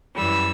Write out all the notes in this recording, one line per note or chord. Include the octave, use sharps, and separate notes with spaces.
F#2 E3 G3 E6